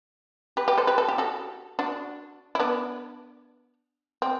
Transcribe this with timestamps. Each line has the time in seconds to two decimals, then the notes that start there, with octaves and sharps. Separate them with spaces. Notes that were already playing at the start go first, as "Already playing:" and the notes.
0.57 G4 B4
0.68 G4 B4
0.78 A4 C5
0.87 G4 B4
0.98 A4
1.08 G4
1.18 F#4 A4
1.79 D4 F#4
2.55 E4
2.60 B3 D4
4.22 C4